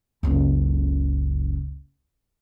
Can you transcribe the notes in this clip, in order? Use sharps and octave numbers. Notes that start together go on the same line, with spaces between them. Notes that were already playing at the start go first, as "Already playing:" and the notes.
F#1 C#2